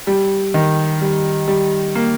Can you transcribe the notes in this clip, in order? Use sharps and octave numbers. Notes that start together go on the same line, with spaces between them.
G3
D#3
G3
G3
A#3